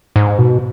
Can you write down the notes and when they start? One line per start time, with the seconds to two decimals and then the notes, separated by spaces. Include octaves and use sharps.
0.16 G#2
0.39 B2